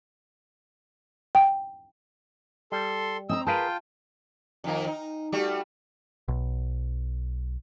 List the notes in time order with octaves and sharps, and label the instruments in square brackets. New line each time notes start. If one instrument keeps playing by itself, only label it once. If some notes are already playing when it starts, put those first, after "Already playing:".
[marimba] G5
[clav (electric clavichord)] G3 [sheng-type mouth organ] A4 C6
[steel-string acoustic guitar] C4 G#5 A#5 [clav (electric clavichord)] D#5 [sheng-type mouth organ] E6
[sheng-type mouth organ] F4 G5 [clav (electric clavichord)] G#4 A#4 B4 [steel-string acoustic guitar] F5 A5
[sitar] F2 D#3 A#3
D#4
G3 A3 F#4
[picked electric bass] B1